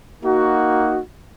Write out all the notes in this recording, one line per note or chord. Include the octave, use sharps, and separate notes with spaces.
A#3 D#4 F#4